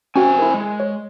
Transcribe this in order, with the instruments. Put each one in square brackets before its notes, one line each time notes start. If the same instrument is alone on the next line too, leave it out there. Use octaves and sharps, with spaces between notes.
[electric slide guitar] C3 C4 G#5 [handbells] C#4 F#4 G5
[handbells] E4 A#4
[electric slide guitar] G#3
[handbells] C#5